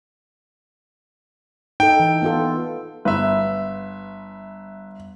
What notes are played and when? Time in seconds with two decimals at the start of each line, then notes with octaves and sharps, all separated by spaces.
1.80 D#4 A4 G5
2.00 E3
2.22 B3 F4 A4
3.05 G1 B4 E5